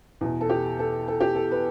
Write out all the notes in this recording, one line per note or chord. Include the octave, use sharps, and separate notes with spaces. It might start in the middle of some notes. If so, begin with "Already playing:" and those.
E2 B2
A4
G4
A4
A4
G4
A4
B4